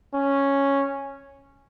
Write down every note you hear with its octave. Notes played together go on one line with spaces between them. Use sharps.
C#4